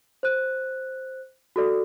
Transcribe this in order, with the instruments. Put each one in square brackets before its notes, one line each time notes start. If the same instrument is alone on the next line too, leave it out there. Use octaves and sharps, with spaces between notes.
[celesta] C5 F#6
F#4 A4 D5